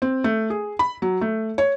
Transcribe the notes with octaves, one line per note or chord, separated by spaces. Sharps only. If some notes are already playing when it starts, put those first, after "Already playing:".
C4
A3
G#4
B5
F#3
A3
C#5